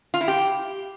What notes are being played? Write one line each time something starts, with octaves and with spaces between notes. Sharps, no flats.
F4
E4
G4